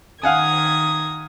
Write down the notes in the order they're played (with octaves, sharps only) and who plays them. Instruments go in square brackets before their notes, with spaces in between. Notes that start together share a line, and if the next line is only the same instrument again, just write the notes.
[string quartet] D#3 D#6 G#6 [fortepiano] F5 F#5 G#5